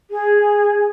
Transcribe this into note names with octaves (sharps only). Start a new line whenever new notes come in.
G#4